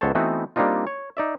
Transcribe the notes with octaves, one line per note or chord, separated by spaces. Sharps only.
C#2 B3 A4 C5 C#5 A5
E3 A3 B3 C4 D#4 F#4
G3 A#3 C4 D4 D#4 F4
C#5
D#4 D5 E5